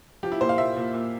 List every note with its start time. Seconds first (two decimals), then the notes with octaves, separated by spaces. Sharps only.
0.23 F3 G4
0.32 E4
0.41 A#2 C5
0.49 F5
0.58 A#2 E5
0.76 A#2
0.94 A#2